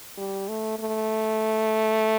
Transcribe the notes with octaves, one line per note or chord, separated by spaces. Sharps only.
G3
A3
A3